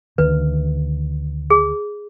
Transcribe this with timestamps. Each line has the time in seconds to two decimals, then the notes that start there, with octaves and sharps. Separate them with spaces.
0.18 D2 D#3 B4
1.50 G#4